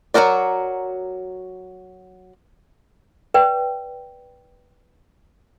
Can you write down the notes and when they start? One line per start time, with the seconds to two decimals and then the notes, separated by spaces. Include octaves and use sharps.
0.14 F#3 D#4 F#4 A#4 D5
3.34 B4 D5 G5